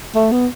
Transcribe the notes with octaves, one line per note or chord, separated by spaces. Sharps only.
A3
B3